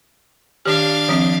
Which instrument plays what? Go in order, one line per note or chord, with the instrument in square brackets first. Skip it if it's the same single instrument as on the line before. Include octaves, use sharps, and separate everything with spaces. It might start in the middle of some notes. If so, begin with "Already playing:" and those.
[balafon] D#3 G4 [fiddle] D4 F5
[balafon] D#3 F3 C4